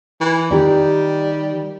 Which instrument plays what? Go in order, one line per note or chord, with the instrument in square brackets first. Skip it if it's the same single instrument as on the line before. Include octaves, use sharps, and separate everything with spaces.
[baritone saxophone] E3
[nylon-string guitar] D#3 G4 [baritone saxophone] G3